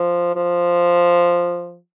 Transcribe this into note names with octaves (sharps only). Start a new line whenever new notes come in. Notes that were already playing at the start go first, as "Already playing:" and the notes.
Already playing: F3
F3